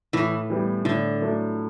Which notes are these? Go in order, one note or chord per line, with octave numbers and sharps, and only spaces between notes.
A2 E3
E3 G3 B3
A2 D3
F#3 A3 D4